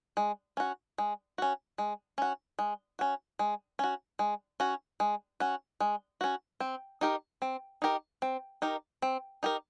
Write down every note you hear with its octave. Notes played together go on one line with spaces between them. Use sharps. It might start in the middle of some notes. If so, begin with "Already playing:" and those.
G#3
C#4 F#4
G#3
C#4 F#4
G#3
C#4 F#4
G#3
C#4 F#4
G#3
C#4 F#4
G#3
C#4 F#4
G#3
C#4 F#4
G#3
C#4 F#4
C4
D#4 G4 A#4
C4
D#4 G4 A#4
C4
D#4 G4 A#4
C4
D#4 G4 A#4